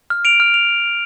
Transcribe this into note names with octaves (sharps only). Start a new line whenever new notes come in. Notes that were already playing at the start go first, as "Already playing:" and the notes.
F6
D7 F7
F6
F7